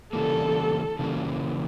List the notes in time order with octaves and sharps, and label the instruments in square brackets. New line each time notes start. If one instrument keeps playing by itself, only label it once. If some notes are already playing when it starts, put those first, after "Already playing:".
[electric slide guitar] C#3 E3 G3 A#3 [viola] A4
[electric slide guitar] C#3 E3 G3 A#3